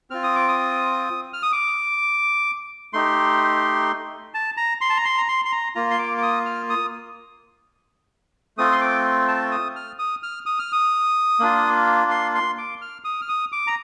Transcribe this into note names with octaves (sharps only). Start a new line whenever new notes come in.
C4 F4 F6
D#6
D6
D#6
F6
D#6
D6
A3 D#4 G4 C6
A5
A#5
C6
A5
A#5
C6
A#5
C6
C6
A#5
A#3 F4 A#5
C6
D6
D6
D#6
F6
D#6
A3 C4 F4 D#6
C6
D6
A5
D#6
F6
D#6
F6
D#6
F6
D#6
A#3 D4 F4
C6
C6
D6
F6
D#6
F6
D#6
D6
A#5